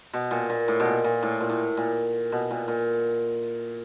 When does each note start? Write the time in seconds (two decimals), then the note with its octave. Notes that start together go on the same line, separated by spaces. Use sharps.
0.14 B2
0.31 A#2
0.50 A#2
0.68 A2
0.80 B2
0.86 A#2
1.04 A#2
1.23 A2
1.40 A#2
1.50 A2
1.77 A#2
2.32 B2
2.51 A#2
2.68 A#2